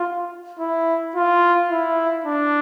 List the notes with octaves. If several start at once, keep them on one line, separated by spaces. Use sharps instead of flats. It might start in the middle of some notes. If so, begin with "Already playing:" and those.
Already playing: F4
E4
F4
E4
D4